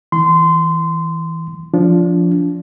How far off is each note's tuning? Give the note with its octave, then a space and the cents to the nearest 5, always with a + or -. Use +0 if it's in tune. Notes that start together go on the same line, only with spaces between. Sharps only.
E3 -15 C6 -20
F3 +0 D4 -25